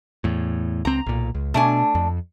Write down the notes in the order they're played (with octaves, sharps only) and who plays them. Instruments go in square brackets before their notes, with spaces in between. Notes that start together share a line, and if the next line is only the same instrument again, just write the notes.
[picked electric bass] E2 A2
[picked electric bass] C#2 C4 [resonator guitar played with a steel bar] A#5
[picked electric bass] B1 A#2
C#2
[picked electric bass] B2 [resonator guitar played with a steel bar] A3 D4 G#5
[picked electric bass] F2